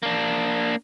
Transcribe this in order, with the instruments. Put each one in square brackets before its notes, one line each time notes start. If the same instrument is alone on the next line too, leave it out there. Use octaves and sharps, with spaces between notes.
[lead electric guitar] A#3 D4